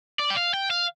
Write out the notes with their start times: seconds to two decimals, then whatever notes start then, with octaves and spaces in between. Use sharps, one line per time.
0.19 D5
0.30 G5
0.37 F5
0.54 G5
0.70 F5